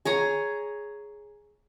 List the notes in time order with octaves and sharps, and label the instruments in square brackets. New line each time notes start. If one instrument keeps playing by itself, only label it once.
[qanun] G#4 C#5 A#5